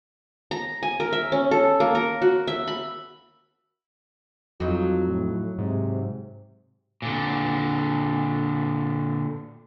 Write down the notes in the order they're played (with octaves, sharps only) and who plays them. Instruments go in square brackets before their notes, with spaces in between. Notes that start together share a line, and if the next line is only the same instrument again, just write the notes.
[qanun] A#5
G#5
A#4
E5
C#4
A4
A#3
A#4
F#4
E5
B5
[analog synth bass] F2 [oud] F#3 D#4 [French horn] F4
[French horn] A2
[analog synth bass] G#2 [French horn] C3
[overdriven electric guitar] A#2 D3